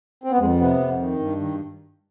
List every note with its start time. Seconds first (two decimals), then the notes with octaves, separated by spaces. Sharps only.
0.24 C4
0.32 B3
0.39 F2 G#3
0.60 C3 B3
0.79 F2
0.99 D#3
1.19 G2
1.40 D#3